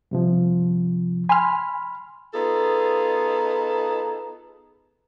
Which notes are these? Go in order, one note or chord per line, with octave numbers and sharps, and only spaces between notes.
G2 C3 F3
G#5 B5 C6 F6
B3 D#4 F4 G#4 A4